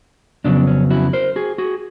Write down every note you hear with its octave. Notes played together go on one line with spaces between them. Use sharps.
F2 C#3 F#3 B3 D4
C#4
E4 F#4
A#4 C5
F#4 G#4
F#4 G#4